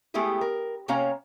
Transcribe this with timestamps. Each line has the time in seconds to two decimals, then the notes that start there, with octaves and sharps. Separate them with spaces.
0.14 G#3 A3 B3 E4 G4 G#4
0.41 A#4
0.88 C3 A#3 C#4 C#5 F5 A#5